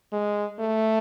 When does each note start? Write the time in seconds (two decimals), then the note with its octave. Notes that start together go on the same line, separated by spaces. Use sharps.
0.13 G#3
0.60 A3